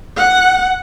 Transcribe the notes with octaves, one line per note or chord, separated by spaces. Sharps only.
F#5